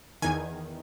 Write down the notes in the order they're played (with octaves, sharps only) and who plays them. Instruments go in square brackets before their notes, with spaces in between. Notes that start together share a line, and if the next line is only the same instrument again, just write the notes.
[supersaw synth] E2 D#3 G#5 G#6